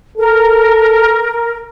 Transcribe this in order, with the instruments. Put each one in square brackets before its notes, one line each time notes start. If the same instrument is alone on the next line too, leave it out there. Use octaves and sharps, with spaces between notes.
[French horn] A4 [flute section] A#4